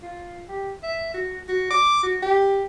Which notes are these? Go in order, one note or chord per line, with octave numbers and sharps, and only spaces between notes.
F4
G4
E5
F#4
F#4
D6
F#4
G4